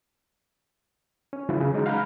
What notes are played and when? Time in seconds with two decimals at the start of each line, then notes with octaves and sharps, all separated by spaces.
1.33 C#4
1.49 C#3 E3 F#3 E4 F4
1.61 C#3
1.73 E3 F#3 G#3 D#4
1.86 F5 F#5 A#5 B5 F6 G6